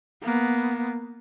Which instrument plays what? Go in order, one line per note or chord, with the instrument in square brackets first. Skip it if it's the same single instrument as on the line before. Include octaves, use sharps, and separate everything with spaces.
[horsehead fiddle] A#3 B3